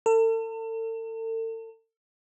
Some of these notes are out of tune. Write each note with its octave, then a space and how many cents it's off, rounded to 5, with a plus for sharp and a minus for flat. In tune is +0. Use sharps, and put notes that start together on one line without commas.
A4 +40